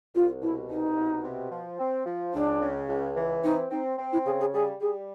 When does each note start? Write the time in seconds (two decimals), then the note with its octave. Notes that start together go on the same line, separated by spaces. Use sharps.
0.15 C2 F4
0.42 B2 E4
0.69 C2 D#4
0.96 B2
1.24 C3
1.52 F3
1.79 C4
2.06 F3
2.33 C#2 D4
2.61 C#3
2.89 C#2
3.16 E3
3.43 C4 D#4
3.71 C4 D#4
3.98 C4
4.12 E4
4.25 C#3 G#4
4.40 G#4
4.53 G3 G#4
4.80 G3 G#4